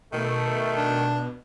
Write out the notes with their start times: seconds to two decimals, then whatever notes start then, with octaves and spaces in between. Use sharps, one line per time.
0.13 B2 D#3 A3
0.76 D4